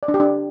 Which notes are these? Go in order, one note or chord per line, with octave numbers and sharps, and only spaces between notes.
D5
D4
G4
D4